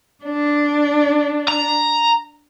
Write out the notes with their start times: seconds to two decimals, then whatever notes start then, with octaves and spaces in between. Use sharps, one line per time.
0.25 D4
1.48 A#5